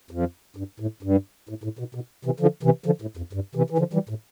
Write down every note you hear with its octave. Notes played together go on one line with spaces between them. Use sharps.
F2
G2
A2
G2
A2
A2
B2
B2
C3 E3
D3 F3
C3 E3
D3 F3
A2
F2
G2
C3 E3
E3
D3 F3
E3 G3
A2